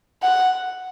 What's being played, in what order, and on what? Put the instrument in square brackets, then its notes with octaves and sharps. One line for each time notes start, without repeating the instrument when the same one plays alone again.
[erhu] F#5